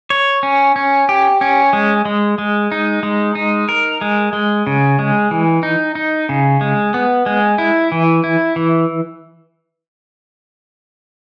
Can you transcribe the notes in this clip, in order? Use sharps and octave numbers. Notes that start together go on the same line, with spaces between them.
C#5
C#4
C#4
G4
C#4
G#3
G#3
G#3
D#4
G#3
D#4
A#4
G#3
G#3
C#3
G#3
E3
D#4
D#4
C#3
G#3
B3
G#3
E4
E3
E4
E3